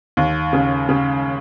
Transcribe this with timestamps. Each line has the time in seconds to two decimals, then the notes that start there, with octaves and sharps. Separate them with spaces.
0.17 D#2
0.53 C#3
0.89 C#3